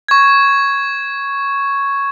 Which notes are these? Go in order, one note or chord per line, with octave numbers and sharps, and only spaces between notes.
C#6 G#6